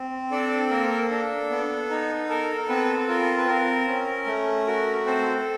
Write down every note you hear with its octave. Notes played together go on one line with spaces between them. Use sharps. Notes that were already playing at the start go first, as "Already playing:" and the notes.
Already playing: C4
D4 A4 D5
A#3 A#4
D4 A4
B3
D#4
A4 A#4
B3 C4 B4
F4 A#4
B4
C4 A#4
C#4
A3
F#4 A#4
C4 A4 C5